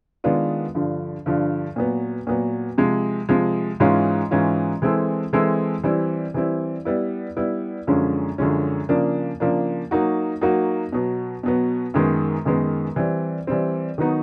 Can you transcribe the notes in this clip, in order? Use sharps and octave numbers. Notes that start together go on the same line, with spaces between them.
D#3 G#3 B3 D4 F4
G2 D3 F3
G2 D3 F3
A#2 F#3 B3
A#2 F#3 B3
C3 F3 G#3
C3 F3 G#3
G#2 E3 G#3 C#4 F4
G#2 E3 G#3 C#4 F4
E3 G#3 C4 E4 A4
E3 G#3 C4 E4 A4
E3 G3 C4 E4
E3 G3 C4 E4
G3 B3 E4
G3 B3 E4
F#2 D3 F3 G#3 C#4
F#2 D3 F3 G#3 C#4
C#3 F3 A#3 D4
C#3 F3 A#3 D4
F#3 A#3 D#4 F#4
F#3 A#3 D#4 F#4
B2 F#3 B3
B2 F#3 B3
F#2 D#3 G#3 B3
F#2 D#3 G#3 B3
E3 G3 C4
E3 G3 C4
D#3 F#3 B3 D#4 F#4